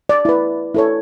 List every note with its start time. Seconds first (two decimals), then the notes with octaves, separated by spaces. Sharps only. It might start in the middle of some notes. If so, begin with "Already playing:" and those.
0.09 D5
0.25 E4 B4
0.74 E4 A4 C#5